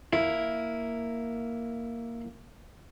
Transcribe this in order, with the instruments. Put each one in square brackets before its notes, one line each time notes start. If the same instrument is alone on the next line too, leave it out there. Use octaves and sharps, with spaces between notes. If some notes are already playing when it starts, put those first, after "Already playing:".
[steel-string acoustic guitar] A#3 [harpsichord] E4